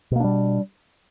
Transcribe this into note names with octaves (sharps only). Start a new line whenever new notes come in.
B2 G3 A#3 D4